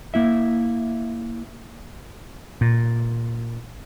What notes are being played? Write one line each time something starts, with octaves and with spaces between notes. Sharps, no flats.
A#3 E4 E5
A#2